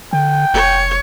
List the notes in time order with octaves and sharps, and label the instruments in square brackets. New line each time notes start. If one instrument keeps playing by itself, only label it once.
[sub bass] D3 [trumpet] G5
[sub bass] F1 [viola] C#5